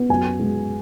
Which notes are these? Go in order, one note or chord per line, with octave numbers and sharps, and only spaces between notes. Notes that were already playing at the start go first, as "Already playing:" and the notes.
Already playing: B3
F#2 G#5
G#3